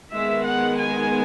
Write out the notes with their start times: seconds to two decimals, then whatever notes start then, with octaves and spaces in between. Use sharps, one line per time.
0.14 D#3 G#3 B3 E5
0.48 F#5
0.81 G#5